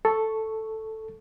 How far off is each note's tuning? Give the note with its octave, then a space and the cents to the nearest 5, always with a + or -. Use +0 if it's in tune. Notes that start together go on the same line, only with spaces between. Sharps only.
A4 +0 C#6 +0